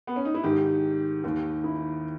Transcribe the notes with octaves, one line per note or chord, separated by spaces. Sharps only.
B3
C#4
D#4
E4
G#2 D#3 G4
D#2 D#3
E4